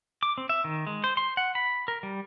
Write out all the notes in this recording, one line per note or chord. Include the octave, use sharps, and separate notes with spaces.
D6
C4
E5
D#3
G#3
C5
C6
F#5
B5
A#4
G3